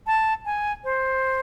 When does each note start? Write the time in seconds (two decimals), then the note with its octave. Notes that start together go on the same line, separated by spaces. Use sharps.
0.07 A5
0.45 G#5
0.84 C5